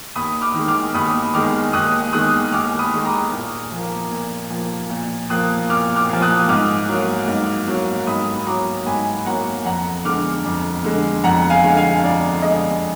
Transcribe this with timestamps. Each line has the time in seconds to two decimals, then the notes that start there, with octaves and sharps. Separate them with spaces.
0.15 D#2 B5 D#6
0.41 D6 F6
0.54 D#3 G#3
0.68 D6 F6
0.94 D#2 B5 D#6
1.33 D#3 G#3 D6 F6
1.73 D#2 D#6 F#6
2.13 D#3 G#3 D#6 F#6
2.52 D#2 D6 F6
2.79 B5 D#6
2.92 D#3 G#3
3.05 A#5 D6
3.33 A#2
3.72 F3 A#3
4.11 A#2
4.50 F3 A#3
4.90 A#2
5.30 F3 A#3 D#6 F#6
5.70 A#2 D6 F6
5.96 D6 F6
6.09 F3 A#3
6.22 D#6 F#6
6.48 G#2 D6 F6
6.88 F#3 A#3
7.27 G#2
7.68 F#3 A#3
8.07 G#2 B5 D#6
8.46 F#3 A#3 A#5 D6
8.86 G#2 G#5 B5
9.26 F#3 A#3 F#5 A#5
9.65 F2 F#5 A#5
10.05 D3 G#3 D6 F6
10.44 F2
10.84 D3 G#3
11.24 F2 F#5 A#5
11.50 F5 G#5
11.64 D3 G#3
11.77 F5 G#5
12.03 F2 D5
12.42 D3 G#3 D#5